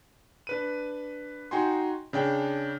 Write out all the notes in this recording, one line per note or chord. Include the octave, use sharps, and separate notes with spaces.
D4 B4 D#7
D#4 F#4 G5 G#5 C6
C#3 D4 G5